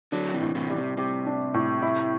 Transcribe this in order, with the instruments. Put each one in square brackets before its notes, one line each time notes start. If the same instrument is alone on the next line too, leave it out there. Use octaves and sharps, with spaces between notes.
[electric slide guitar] D3 F#3 [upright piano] D4
[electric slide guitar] C3 E3
[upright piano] A2
[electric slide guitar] C3 E3
[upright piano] G3
[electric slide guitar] C3
[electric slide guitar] C3 [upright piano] G4
[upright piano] D4
A2
E4